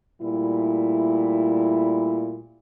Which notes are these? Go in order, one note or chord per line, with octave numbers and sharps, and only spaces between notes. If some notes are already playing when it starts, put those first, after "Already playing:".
A#2 G3 A3 E4